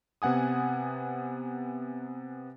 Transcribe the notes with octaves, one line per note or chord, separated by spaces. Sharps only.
C3 B3 F#5 G#5 D#6